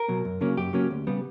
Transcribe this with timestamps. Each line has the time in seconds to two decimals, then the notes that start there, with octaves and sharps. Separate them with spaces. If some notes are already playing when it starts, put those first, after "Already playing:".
Already playing: A#4
0.08 B2 F#3
0.25 F#2
0.41 C#3 F#3 A#3 C#4
0.57 F#2 G4
0.73 C#3 F#3 A#3 C#4
0.91 D2
1.07 C#3 G3 B3